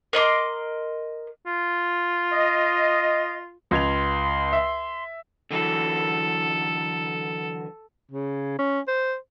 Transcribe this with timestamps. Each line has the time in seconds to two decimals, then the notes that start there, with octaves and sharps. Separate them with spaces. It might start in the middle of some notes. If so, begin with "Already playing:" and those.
0.13 A#4 D#5 C6 D6
1.47 F4
2.32 D#5
3.71 C#2 C6 G#6 F7
4.53 E5
5.51 D3 E3 F#3 A4
8.11 C#3
8.59 C#4
8.88 C5